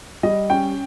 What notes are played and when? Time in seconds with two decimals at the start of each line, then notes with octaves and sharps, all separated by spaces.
0.23 G3 D#5
0.50 C#4 G5